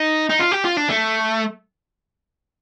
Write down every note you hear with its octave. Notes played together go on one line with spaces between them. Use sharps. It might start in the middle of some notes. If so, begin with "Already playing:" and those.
Already playing: D#4
D#4
F4
G4
F4
D4
A3